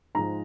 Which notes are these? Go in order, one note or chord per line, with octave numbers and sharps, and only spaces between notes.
G#2 F3 G#3 A#5